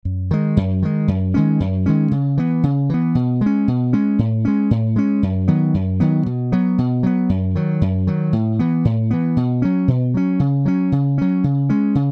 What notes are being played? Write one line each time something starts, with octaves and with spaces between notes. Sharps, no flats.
F#2
D#3 G#3
F#2
D#3 G#3
F#2
D#3 G#3 C#4
F#2
D#3 G#3 C#4
C#3
E3 B3
C#3
E3 B3
B2
G#3 C#4
B2
G#3 C#4
A2
G#3 C#4
A2
G#3 C#4
F#2
D#3 F#3 B3
F#2
D#3 F#3 B3
B2
F#3 B3
B2
F#3 B3
F#2
D#3 F#3
F#2
D#3 F#3
A2
E3 B3
A2
E3 B3
B2
F#3 C#4
B2
F#3 C#4
C#3
F#3 C#4
C#3
F#3 C#4
C#3
G#3 C#4
C#3